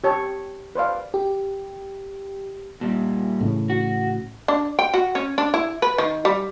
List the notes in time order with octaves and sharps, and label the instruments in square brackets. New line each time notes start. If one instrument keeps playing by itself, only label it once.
[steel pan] G4 C#5 A5
B4 C5 D5 F5
[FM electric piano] G4
[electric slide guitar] A#2 G3
[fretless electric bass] A2 C#3 E3
[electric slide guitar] F#4
[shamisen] D4
G5
F#4
C#4
D4
E4
B4
D#3
G3